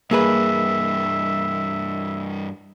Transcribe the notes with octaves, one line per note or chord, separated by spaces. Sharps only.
G2 E3 A#3 G#4 B4 E5